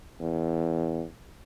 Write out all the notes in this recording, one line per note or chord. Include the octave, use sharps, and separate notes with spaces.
E2